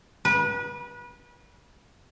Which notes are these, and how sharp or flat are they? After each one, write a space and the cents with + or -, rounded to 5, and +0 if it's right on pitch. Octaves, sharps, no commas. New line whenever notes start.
B4 -30